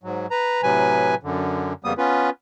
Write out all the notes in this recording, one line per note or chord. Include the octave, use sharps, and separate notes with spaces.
G#2 F#3
B4 A#5
A2 C3 F#3 B4 G#5
F#2 D3
F2 C#3 G3 A#3 B3 D#6
B3 C#4 F4 B4